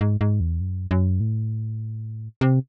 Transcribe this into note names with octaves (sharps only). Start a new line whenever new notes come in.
G#2
G#2
E2
F#2
F#2
A2
C3